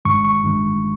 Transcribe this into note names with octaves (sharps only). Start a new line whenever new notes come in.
G1 G2 D#3 G#3 C#6
C#6
G1 G2 D#3 G#3